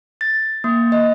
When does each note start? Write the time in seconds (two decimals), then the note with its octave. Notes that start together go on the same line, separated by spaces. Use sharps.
0.21 A6
0.64 A#3
0.92 D#5